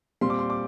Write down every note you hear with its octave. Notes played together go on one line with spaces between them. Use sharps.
A#2 G3 C4 C6
D6
C6
D6